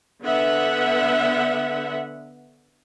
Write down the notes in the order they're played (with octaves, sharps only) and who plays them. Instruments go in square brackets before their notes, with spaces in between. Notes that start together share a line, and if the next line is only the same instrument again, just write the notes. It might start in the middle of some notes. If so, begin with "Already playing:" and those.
[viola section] D3 B3 E5 F#5